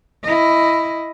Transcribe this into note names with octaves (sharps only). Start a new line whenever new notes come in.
E4 D#5